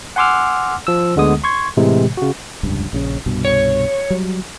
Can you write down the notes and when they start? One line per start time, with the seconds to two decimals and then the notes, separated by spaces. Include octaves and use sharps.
0.16 F#5 G#5 C6 D6 E6 F6
0.87 F3 E6
1.16 D2 D3 G#3 B3 D#6
1.44 C6 C#6 G#6
1.77 A2 C3 E3 G#3
2.17 C#3 F#4
2.63 F1 C#2 G2
2.93 A#1 C#3 C#4
3.26 C2 G2 B2
3.45 C#5
4.10 F#3 G3